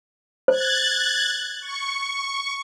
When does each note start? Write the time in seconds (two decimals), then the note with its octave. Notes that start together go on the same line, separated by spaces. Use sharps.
0.48 C5 F#6 G#6 A6
1.60 C#6